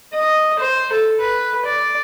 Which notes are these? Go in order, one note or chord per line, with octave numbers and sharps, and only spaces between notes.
D#5
C5
A4
B4
D5